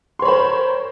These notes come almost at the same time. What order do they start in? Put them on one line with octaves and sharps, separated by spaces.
C6 C#5 B5 C5 A#4